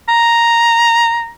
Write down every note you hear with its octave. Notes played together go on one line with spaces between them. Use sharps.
A#5